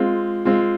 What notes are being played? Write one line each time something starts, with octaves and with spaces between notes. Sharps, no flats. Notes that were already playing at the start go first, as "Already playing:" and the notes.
Already playing: G#3 C4 F4
G#3 C4 F4